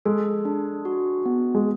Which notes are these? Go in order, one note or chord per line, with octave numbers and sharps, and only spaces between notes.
G#3 A4
D4
F#4
B3
G#3